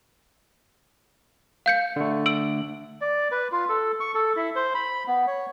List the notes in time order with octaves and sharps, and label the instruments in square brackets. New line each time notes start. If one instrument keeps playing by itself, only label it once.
[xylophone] F5 G6 C#7
[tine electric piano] D3 A3
[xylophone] E6 D7 F#7
[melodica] D5
B4
F4
A4
C#6
A4
E4
C5
B5
B3
C#5